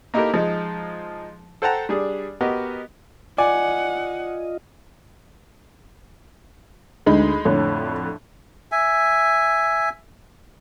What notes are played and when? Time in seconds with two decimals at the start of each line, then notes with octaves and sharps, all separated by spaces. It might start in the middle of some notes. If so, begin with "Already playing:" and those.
0.14 A#3 D#4 E4 G4 A4 A#4
0.34 F3 G#3 D#4
1.62 A4 C5 F#5 G5 A5 A#5
1.89 G3 D4 G#4
2.41 B3 F#4 G4 A#4 D#5
3.38 F4 D5 D#5 F#5 G#5
7.06 D2 G#3 D#4 B5
7.45 F2 A2 D3 C#5
8.72 E5 G#5